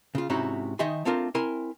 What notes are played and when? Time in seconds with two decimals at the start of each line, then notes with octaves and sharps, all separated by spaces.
0.15 C#3 F4
0.30 G#2 C3 C#4 D#4 E4 F#4
0.79 D#3 D#4 D#5 E5 G#5 C6
1.05 A3 C4 D4 F4 A#4
1.35 C4 E4 A#4 G#5 C6